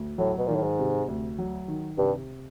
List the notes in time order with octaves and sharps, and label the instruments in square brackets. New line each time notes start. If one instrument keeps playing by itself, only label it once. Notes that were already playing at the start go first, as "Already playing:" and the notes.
Already playing: [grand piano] D2
[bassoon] A2 [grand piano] F#3
[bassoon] B2
[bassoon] A#2 [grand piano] D#3
[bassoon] A2
G#2
[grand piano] C3
D2
F#3
D#3
[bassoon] G2 [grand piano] C3